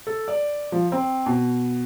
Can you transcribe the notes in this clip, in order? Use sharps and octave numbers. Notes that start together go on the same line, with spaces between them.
A4
D5
F3
C4
B2